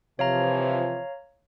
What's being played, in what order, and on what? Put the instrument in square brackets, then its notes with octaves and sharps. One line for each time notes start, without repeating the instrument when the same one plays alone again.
[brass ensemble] C3 E3 F3 [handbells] C#5 F5 A#5